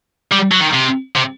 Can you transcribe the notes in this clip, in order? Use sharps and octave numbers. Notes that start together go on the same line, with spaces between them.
G3
F#3
D#3
C3
C3